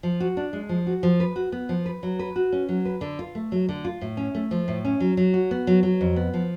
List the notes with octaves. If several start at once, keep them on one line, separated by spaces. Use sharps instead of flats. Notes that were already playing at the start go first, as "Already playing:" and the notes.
F3
F#4
D4
G#3
F3
F#4
F3
B4
F#4
B3
F3
B4
F#3
B4
F#4
C#4
F#3
B4
D3
F4
A3
F#3
D3
F4
A2
C#4
A3
F3
A2
C#4
F#3
F#3
F#4
B3
F#3
F#3
F2
B3
F3